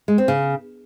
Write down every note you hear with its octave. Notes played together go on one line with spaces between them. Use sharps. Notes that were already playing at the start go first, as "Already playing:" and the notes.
G#3
C4
C#3